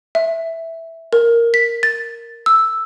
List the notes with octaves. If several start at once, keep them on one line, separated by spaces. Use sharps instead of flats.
E5
A#4
B6
A6
E6